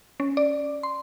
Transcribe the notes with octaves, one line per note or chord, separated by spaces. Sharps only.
C#4
D5
C6